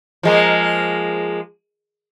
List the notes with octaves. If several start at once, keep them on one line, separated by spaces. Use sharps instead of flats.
F3 G#3 A#3